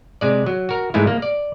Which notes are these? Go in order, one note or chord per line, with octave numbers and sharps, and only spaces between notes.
C3 G#3 D5
F#3
F#4 A#4
G#2 E3 G#3 A3 E4
A#3
D5